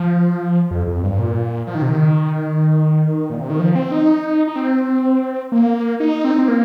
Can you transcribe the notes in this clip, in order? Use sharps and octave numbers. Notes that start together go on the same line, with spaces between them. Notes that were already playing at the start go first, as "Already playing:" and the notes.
Already playing: F3
F2
F2
G2
A#2
F3
D#3
C3
D#3
A#2
C3
D#3
F3
C4
D#4
D#4
C4
A#3
D#4
C4
D#4
C4
A#3